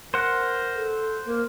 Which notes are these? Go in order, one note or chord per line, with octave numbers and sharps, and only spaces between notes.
A#4 C5 F#5
A4
A#3 A#4